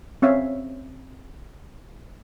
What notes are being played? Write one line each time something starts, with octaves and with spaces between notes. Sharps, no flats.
C4 C#4 C#5 E5 F5